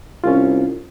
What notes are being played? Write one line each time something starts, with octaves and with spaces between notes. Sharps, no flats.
C2 C#4 F4